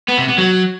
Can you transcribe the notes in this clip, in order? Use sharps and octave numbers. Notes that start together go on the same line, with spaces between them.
B3
C3
B3
F#3